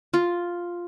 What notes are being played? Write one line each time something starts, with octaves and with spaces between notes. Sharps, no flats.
F4